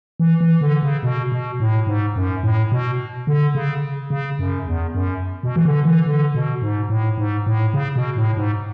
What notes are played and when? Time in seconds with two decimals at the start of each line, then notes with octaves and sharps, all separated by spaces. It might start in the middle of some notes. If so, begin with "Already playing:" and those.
0.20 E3
0.41 E3
0.61 D3
0.83 C#3
1.03 B2
1.32 B2
1.60 A2
1.87 G#2
2.16 F#2
2.43 A2
2.72 B2
3.27 D3
3.55 C#3
4.10 C#3
4.39 F#2
4.67 E2
4.95 F#2
5.43 B2
5.56 E3
5.65 D3
5.85 E3
6.06 D3
6.35 B2
6.62 G#2
6.90 A2
7.18 G#2
7.47 A2
7.74 C#3
7.96 B2
8.17 A2
8.37 G#2